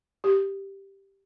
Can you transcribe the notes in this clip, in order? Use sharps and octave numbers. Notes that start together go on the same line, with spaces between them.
G4